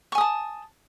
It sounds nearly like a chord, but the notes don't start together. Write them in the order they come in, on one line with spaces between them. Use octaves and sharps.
C#6 G#5 D#6 A5